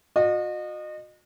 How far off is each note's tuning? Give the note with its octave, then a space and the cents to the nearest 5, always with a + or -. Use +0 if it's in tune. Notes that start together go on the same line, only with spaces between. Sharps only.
F#4 -45 D#5 -30